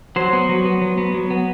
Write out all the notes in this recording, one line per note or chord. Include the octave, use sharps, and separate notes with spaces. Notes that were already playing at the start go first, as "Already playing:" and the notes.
F#3 C5
B3
F#3
B3
F#3
B3
F#3
B3